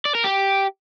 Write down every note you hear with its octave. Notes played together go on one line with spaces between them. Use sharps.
D5
A#4
G4